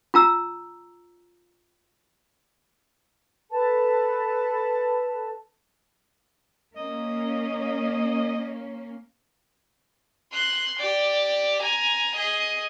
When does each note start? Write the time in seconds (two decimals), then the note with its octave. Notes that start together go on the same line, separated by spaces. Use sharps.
0.14 F4 A#5 E6
3.51 A4 B4 A5
6.76 A#3 C#4 D#5
10.32 C6 F#6
10.79 G4 D5
11.62 G#5 A#5
12.15 G#4 D#5